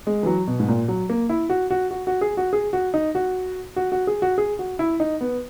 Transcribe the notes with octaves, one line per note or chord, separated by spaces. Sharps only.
G#3
E3
F#3
B2
G#2
A#2
F#3
A#3
E4
F#4
F#4
F#4
F#4
G#4
F#4
G#4
F#4
D#4
F#4
F#4
F#4
G#4
F#4
G#4
F#4
E4
D#4
B3